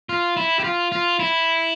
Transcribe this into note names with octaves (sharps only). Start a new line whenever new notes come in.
F4
E4
G4
F4
F4
E4